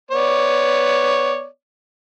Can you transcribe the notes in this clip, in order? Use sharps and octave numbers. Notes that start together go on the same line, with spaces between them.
B3 C#5 D5